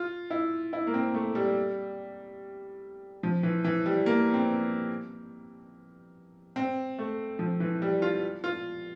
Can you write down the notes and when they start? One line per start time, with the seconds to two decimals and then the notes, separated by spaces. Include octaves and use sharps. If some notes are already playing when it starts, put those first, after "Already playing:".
Already playing: F4
0.30 E4
0.73 E4
0.87 A#3
0.94 C4
1.14 A3
1.35 G3
3.23 F3
3.43 E3
3.64 E3
3.86 G3
4.06 A#3
4.34 C4
6.56 C4
6.99 A3
7.39 F3
7.60 E3
7.82 G3
8.02 F4
8.44 F4